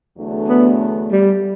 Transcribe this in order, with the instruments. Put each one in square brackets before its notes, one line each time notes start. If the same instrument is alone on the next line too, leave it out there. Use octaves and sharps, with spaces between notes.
[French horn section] E2 D3 F#3 A3 D4
[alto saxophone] B3
G3